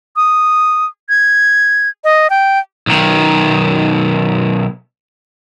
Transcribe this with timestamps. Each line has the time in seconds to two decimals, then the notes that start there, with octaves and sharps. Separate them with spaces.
0.16 D#6
1.09 G#6
2.04 D#5
2.30 G5
2.87 B1 D#3